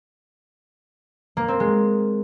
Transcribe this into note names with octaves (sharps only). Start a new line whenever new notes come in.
A#3
C4
G#3